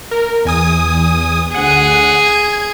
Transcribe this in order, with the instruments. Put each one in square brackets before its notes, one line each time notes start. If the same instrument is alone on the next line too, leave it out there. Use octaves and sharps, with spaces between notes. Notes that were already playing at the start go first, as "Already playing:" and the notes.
[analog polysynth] A#4
E2 G#5 D#6
[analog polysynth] D2 F#5 [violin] G#4
[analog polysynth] G#6